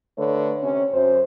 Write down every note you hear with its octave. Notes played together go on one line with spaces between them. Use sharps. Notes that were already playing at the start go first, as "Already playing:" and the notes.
D3 A3 B4 C#5
C3 C#4
F#2 C5